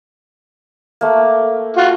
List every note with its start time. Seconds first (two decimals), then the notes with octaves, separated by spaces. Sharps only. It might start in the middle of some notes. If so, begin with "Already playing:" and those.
1.01 A3 A#3
1.77 F4 F#4